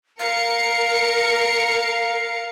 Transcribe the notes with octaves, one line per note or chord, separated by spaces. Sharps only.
A#4 F5 C#7